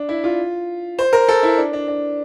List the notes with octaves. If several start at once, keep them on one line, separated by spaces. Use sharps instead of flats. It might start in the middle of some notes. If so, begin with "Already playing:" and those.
Already playing: D4
E4
F4
C5
A#4
A4
E4
D4
D4
D4